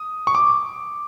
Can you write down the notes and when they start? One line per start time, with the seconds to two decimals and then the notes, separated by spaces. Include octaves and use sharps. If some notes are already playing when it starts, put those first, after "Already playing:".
Already playing: D#6
0.27 C#6
0.35 D6